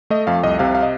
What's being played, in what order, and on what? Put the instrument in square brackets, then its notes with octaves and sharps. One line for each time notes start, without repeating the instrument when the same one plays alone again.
[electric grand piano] A3 D#5
F2 F5
C2 D#5
C3 F5
F5
D#5